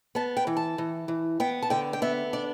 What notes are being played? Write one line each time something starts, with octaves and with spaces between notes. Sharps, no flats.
B3 A5
G5
E3
A5
E3
E3
B3 G5
A5
D3 G5
G5
B3 E5
D4 D5